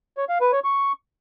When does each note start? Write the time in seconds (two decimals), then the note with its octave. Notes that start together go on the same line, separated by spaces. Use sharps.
0.17 C#5
0.29 F5
0.41 B4
0.52 C#5
0.64 C#6